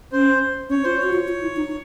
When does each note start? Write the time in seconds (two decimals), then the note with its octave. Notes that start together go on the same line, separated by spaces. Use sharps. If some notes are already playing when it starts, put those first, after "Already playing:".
0.12 C#4 C5
0.70 C#4 C#5
0.84 F4 C5
0.97 C#5
1.03 F#4
1.13 F4
1.28 F4
1.42 E4
1.56 D#4